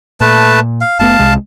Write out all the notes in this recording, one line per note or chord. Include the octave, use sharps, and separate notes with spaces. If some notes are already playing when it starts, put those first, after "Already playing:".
A#2 A3 B4 A5
F5
F#1 A3 B3 F5 A5
C2 C3 G#3